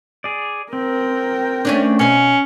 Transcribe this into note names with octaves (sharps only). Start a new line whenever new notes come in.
G#4 D5
C4 A#4 G5
A3 C#4 D4
B2 C#4 F5